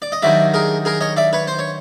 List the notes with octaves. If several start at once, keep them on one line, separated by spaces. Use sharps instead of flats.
D5
D#5
G2 D#3 F#3 D5 E5
G#4 A#4
G#4 A#4
C#5 D#5
D5 E5
B4 C#5
C5
C#5